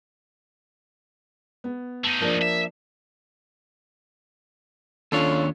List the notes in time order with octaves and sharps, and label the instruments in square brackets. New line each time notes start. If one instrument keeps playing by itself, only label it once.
[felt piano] B3
[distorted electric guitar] A3 D#4
[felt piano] F3 A#3 D4
[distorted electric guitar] E5
[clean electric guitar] D#2 D4 C#5 [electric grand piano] C#4 F4 A4